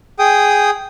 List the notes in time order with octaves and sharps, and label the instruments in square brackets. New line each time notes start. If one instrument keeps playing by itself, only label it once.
[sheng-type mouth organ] G#4 G5 D#6